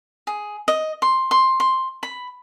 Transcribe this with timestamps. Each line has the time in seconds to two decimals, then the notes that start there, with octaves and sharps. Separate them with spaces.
0.27 G#4
0.68 D#5
1.02 C6
1.31 C6
1.60 C6
2.03 B5